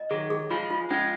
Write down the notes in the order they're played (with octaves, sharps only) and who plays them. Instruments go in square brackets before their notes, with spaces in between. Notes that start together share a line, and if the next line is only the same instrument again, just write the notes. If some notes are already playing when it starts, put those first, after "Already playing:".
Already playing: [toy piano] D#5
[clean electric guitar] D#3 F#3 [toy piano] G#4
[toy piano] G#4
[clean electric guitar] F3 G#3 [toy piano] F4
[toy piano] F4
[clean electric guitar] F3 G#3 [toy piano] C#4